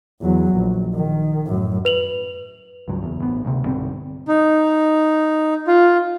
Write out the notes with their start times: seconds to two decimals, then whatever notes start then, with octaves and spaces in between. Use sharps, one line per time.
0.21 E2 F#3
0.56 A#1
0.95 D#3
1.47 F#2 A2
1.85 B4 F7 F#7
2.88 C#2 G2 F#3
3.03 F#1 E2
3.20 A1 B3
3.45 D2 C3
3.64 B1 G2 D3 C4
4.28 D#4
5.67 F4